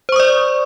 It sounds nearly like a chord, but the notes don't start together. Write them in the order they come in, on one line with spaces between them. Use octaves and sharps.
C5 C#6 D#6 D5